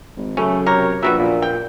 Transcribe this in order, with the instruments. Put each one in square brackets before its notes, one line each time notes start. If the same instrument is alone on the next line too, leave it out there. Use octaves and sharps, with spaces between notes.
[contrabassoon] G#1
[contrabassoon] F#2 [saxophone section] C#3 A3 [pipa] C#4
[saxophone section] C3 G4 C#5 [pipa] A#4
[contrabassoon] A#1 [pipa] F#3 G3 B3 [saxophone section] F#4 E5
[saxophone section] E2 A#2
[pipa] G5